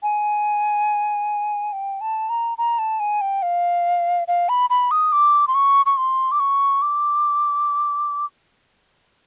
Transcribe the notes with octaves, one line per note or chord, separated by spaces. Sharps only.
G#5
G5
A5
A#5
A#5
A5
G#5
G5
F5
F5
B5
B5
D#6
D6
C6
C#6
C#6
C6
D6
C#6
D6